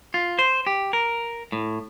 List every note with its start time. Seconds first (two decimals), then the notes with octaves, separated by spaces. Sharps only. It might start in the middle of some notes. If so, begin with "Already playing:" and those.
0.14 F4
0.39 C5
0.67 G4
0.93 A#4
1.52 A2